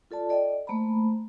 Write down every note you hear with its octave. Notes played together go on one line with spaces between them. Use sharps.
F4 A4 D5 A5
A4 D5 D#5 G5
A3 A#3 C5 A#5 B5